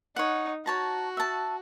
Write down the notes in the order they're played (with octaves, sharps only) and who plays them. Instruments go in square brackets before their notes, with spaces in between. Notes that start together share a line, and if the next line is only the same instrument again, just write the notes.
[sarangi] D#4 [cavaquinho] C#5 F#5
[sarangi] F#4 [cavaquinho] C#5 A5 A#5
[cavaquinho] E5 A5